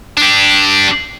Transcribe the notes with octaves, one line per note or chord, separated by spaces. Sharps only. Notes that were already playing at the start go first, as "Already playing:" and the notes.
D4 G4